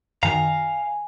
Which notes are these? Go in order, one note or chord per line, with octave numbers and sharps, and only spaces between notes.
F#2 D#3 F5 G#5 A#5